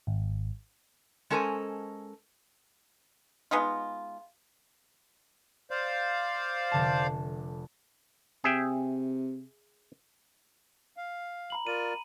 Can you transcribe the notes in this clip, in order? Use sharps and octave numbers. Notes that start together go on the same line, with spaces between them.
G#1
G#3 C#4 A4 A#4 C5 G#5
G#3 B3 D#4 F4
C5 D5 F5
F1 D3 A5
C3 G#4 E5 G5
F5
A#5 B5 F#7
F4 A#4 D5 D#7